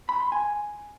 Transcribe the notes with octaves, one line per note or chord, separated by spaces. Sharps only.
B5
C6
G#5